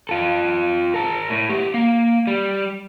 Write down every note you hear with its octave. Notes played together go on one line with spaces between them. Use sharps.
F4 A4
A#4 A5
A2
B3 G4
A#3
G3